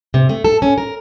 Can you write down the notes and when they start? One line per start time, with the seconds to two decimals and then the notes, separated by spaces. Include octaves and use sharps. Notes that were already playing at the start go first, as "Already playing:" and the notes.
0.14 C3
0.29 A3
0.44 A4
0.62 C#4
0.78 A#4